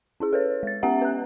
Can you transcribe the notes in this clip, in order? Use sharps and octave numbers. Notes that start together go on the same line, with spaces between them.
C#4 E4 G#4
A4 B4 C#5
G#3 A6
B3 C#4 G4 E5 F#5 A#5
B4 F#6